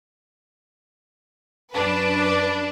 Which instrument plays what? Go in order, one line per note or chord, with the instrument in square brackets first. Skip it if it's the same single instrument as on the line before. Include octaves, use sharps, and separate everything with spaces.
[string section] F#2 D4 B4